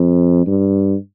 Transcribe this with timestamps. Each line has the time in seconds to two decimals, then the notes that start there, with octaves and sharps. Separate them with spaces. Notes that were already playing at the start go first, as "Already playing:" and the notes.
Already playing: F2
0.47 G2